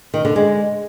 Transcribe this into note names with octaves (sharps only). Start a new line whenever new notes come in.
D#3
D3
G#3